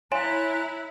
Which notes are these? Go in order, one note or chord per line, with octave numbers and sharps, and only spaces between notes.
E4 C#5 G#5 A#5 C6 F#6 E7